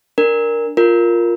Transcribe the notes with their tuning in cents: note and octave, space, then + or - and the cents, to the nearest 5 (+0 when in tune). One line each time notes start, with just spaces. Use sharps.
D4 +0 A#4 +0
F4 +0 A#4 +0